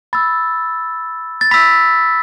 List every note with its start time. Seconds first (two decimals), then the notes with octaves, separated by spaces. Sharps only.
0.13 B5 E6 A6
1.41 A6
1.51 B5 E6 B6